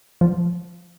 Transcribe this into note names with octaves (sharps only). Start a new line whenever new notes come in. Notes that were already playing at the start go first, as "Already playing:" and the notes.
F3